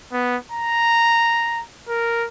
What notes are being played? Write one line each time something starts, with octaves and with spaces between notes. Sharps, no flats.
B3
A#5
A#4